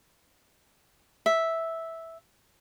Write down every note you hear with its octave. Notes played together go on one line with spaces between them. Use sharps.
E5